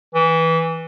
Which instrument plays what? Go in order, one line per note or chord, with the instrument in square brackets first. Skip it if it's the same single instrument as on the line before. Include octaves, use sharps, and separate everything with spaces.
[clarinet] E3